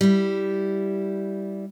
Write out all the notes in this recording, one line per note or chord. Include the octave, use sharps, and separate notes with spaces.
G3 E4